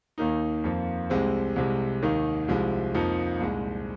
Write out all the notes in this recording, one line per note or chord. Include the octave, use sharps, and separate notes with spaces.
D#2 D#3 A#3 D#4
F2 F3 A#3 F4
C2 C3 G#3 C4
C2 C3 G#3
D#2 D#3 A#3 D#4
C2 C3 F3 G#3
F2 F3 A#3 D#4
C2 A#2 G#3